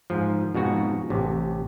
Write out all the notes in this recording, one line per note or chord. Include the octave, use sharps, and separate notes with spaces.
G#2 F3
F2 G#2 B2 F#4
A1 C3